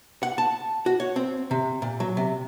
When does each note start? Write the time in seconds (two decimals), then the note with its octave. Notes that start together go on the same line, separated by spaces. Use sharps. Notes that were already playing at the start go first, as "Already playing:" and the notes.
0.23 F#5
0.38 A5
0.86 F#4
1.00 C#5
1.16 C4
1.51 C3
1.82 A#2
2.00 F#3
2.17 C3